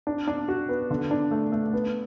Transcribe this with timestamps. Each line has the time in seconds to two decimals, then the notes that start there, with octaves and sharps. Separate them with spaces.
0.07 D4
0.27 D4
0.48 F#4
0.69 B3
0.90 D3
1.11 D4
1.31 A3
1.52 A3
1.73 B3